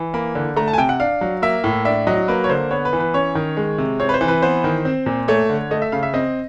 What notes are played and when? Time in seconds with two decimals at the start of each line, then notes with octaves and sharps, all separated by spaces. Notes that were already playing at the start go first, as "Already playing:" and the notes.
Already playing: E3
0.14 A#3 B5
0.35 D3
0.56 A3 A#5
0.68 A5
0.73 G#5
0.78 C3 G5
0.89 F#5
1.00 D4 F5
1.21 F#3
1.42 A#3 E5
1.64 A2
1.85 D4 E5
2.07 F#3 D#5
2.28 A#3 B4
2.44 C#5
2.49 D3 C5
2.71 B3 C#5
2.85 B4
2.93 E3
3.00 B4
3.14 C#4 C#5
3.35 D#3
3.57 G#3
3.78 C3
4.00 C4 C#5
4.09 B4
4.14 C5
4.21 E3
4.28 B4
4.42 B3 C5
4.64 D#3
4.85 C4
5.06 A#2
5.28 A3 C#5
5.49 D3
5.71 A3 D#5
5.82 E5
5.92 C#3 F5
6.03 E5
6.14 C4 D#5